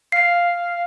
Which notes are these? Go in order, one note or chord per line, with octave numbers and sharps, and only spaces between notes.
F5 C7